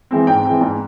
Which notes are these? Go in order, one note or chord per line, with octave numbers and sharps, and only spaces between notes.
E3 G#3 C4
G#2 G5
E3 G#3 C4
G#2